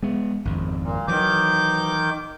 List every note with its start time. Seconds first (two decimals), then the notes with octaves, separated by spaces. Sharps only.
0.03 G#3 B3
0.45 G#1 F2
0.81 A#2
1.08 D#3 E3 F#3 D6 G6